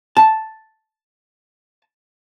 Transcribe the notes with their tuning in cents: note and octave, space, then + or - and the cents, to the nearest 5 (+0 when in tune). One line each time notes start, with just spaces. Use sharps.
A5 +0